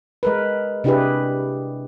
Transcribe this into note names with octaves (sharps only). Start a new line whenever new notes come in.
G#3 A#4 B4
C3 D4 E4 G4 G#4 B4